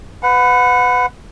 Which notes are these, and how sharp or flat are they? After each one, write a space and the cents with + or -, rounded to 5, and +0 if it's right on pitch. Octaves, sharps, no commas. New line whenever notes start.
B4 +20 F#5 -25